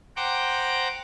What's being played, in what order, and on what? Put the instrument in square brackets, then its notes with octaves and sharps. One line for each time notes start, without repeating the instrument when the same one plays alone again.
[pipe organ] C5 F#5 G5 A#5 D6